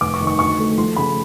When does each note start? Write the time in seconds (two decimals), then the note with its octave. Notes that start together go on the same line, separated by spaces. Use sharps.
0.01 F1 D6
0.14 C#6
0.21 D#3
0.27 C#6
0.39 D2 C#6
0.59 A3
0.78 F3 C6
0.96 C#3 B5